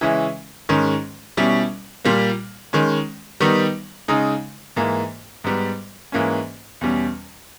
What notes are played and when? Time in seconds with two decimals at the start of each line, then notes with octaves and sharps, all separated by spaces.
0.01 C#3 E3 G#3 C#4 E4
0.69 G#2 D#3 G#3 C#4
1.37 B2 G3 C#4 E4
2.05 A#2 G3 A#3
2.73 D#3 G#3 C#4
3.40 D#3 G3 B3 D#4
4.08 C#3 G#3 D#4
4.77 G#2 E3 A#3
5.44 G#2 G3 B3
6.12 G#2 E3 A#3 C#4
6.81 E2 B2 G3 C#4